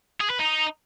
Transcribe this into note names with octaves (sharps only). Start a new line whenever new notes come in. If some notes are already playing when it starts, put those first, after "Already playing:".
G#4
B4
D#4